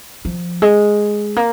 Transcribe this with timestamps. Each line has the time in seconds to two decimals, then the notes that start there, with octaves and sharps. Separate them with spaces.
0.25 F3
0.62 G#3
1.36 A#3